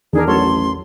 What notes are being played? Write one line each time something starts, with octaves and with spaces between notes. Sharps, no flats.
E2 D#3 D4 G#4 A#4
A1 F#3 A4 C#5 C6